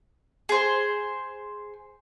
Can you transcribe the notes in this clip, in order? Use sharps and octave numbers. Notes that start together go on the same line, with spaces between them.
G#4 C5